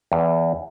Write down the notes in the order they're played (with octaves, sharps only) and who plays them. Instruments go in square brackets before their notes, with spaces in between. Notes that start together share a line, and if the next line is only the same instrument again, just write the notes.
[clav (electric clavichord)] E2